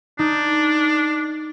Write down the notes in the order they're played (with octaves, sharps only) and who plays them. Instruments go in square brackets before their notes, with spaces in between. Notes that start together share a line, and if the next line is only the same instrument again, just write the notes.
[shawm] D4 [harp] D#4